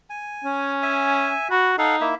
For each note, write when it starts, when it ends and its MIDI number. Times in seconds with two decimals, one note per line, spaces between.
0.10 0.72 80
0.44 1.34 61
0.82 1.48 76
0.82 1.48 80
1.51 1.74 66
1.51 1.71 83
1.78 2.10 63
1.78 1.96 69
1.78 1.96 77
1.78 1.96 78
2.01 2.15 58
2.01 2.15 64
2.01 2.15 76